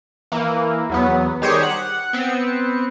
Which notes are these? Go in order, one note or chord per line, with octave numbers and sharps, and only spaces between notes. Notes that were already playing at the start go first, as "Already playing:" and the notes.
E3 A#3
E2 F#3 B3
D#3 G3 G4 G#4 C5 C#5
F#5
B3 C4 C#7